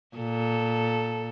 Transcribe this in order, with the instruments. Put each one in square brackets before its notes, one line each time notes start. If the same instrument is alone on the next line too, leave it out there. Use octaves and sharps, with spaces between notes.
[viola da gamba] A#2 A4